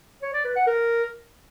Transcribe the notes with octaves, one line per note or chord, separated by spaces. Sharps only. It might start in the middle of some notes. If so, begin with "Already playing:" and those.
C#5
D5
B4
F#5
A#4